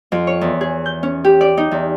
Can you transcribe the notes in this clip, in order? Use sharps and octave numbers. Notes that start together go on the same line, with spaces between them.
F2
C#5
E2
G#4
G6
C#4
G4
D5
D#4
E2